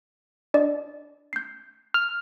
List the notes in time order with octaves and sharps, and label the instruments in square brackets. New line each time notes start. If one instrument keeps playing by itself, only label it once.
[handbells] D4 D5 D#5
G6 C7
[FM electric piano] F6